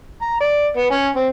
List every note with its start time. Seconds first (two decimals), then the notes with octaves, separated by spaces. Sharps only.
0.22 A#5
0.40 D5
0.77 B3
0.90 C#4
1.15 C4